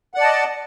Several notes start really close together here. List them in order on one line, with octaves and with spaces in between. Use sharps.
F#5 D5 A5 D#5